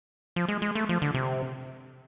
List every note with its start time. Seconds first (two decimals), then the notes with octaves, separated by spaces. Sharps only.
0.36 F3
0.48 G#3
0.62 G#3
0.75 A3
0.89 F3
1.02 D3
1.14 C3